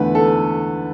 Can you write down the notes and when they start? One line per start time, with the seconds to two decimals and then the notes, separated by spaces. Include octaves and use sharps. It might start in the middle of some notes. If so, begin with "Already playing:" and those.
Already playing: E2 D3 A3 B4
0.15 A4